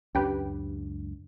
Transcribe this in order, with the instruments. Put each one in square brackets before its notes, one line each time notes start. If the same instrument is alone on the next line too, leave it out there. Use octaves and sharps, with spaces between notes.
[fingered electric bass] C#2 F#2 D4 [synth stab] C#4 G4 B4